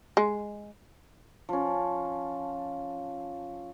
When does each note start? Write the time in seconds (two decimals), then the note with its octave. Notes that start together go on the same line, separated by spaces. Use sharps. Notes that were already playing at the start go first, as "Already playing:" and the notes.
0.17 G#3
1.49 F3 C#4